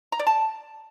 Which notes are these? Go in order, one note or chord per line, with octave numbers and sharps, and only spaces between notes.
A#5
D5
A5